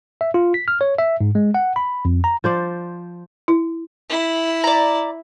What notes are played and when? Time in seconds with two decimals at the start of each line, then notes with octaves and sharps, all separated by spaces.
0.21 E5
0.34 F4
0.54 B6
0.68 F6
0.81 C#5
0.98 E5
1.21 G#2
1.35 G#3
1.54 F#5
1.76 B5
2.05 F2
2.24 A#5
2.44 F3 C5 D5
3.48 E4
4.09 E4
4.64 D5 A#5